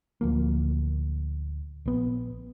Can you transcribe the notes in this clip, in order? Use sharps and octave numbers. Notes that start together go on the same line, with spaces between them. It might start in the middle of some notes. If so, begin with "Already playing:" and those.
D1 D2 F3 A#3
A#1 B3